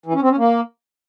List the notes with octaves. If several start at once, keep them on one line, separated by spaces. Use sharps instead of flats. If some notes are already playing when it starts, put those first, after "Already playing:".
E3
C#4
C4
C#4
A#3